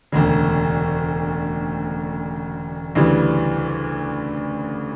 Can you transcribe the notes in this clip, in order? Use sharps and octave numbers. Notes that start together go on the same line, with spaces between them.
E1 D2 C#3
D2 C#3 E3 G3